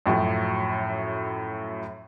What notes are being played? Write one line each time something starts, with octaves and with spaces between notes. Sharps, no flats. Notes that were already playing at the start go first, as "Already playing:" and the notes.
F#2 A2 F3 F#3